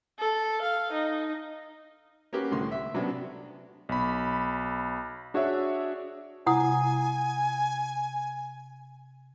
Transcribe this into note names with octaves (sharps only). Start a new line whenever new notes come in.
A4
F5
D#4
A#3 C#4 F#4 G4 B4
C2 A2 D3 C6
E5
C3 F#3 B3 C#4 D4
B1 B5
D4 F#4 G#4 C#5 D5 E5
C3 E4 F#5 G#5 A#5 D#6